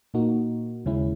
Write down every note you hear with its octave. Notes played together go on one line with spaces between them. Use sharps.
A#2 A#3 D#4 F#4
D#2 C#3 G#3 C#4 E4